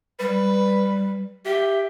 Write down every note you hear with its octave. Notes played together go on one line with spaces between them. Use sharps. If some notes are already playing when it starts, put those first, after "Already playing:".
G3 B4
G4 E5